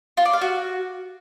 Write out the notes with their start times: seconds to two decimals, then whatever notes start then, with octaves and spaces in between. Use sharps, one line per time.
0.17 F4
0.25 D5
0.33 F5
0.41 F#4